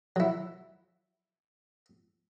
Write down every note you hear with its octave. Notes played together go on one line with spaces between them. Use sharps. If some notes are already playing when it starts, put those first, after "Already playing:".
F#3 E4